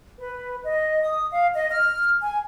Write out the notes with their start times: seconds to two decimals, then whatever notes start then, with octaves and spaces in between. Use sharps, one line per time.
0.19 B4
0.64 D#5
1.02 D#6
1.32 F5
1.54 D#5
1.70 F6
2.22 G#5